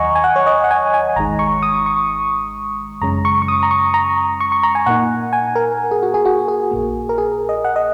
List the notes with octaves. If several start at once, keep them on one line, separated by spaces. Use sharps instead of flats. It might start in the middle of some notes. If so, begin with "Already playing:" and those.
Already playing: D#2 D#3 F#3 D#5 F#5 G#5 A#5 C#6
G#5
F#5
C#5
D#5
F#5
G#5
G#5
G#1 G#2 D#3 G#3 D#4 A#5
C#6
D#6
C#6
F#2 C#3 G#3 C#4 A#5
C#6
C#6
D#6
A#5
C#6
A#5
C#6
C#6
A#5
G#5
A#2 A#3 D#4 F#5
G#5
A#4
G#4
F#4
G#4
F#4
G#4
A#1 A#2 A#3
A#4
G#4
D#5
F#5
D#5